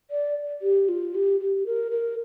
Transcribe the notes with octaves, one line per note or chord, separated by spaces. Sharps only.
D5
G4
F4
G4
G4
A#4
A#4